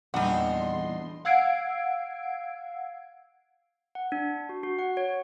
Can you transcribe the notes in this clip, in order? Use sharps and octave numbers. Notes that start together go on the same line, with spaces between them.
A#1 E2 G3 D4 D#4 F#5 C6
F5 F#5 E6 G#6 C7 D7
F#5
D4
F#4
F#4
F#5
C#5